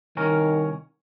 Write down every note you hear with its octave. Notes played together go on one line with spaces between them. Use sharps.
C2 D#3 C#4 A#4